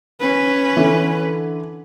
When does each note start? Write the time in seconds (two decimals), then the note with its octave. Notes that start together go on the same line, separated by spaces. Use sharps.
0.20 C#4 B4
0.77 D3 E3